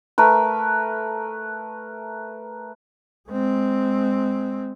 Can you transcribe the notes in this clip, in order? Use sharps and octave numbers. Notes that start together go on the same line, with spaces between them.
A3 A#4 B4
G#3 C4